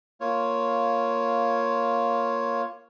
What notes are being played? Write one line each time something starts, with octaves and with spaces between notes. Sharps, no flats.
A#3 F4 C#5